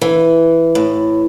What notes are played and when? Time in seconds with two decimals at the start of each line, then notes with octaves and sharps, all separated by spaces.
0.01 E3
0.75 A2